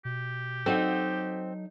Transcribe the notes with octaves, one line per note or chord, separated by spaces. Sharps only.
B2 G4
F#3 C4 D#4 F#4 A4